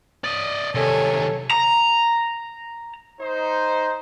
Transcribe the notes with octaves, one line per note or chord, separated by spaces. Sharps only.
D5 D#5
C3 D#3 A4 C#5 G#5
A#5
D#4 C5